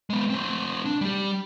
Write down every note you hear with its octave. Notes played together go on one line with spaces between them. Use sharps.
G#3 B3
A3 C4
D4
G3 G4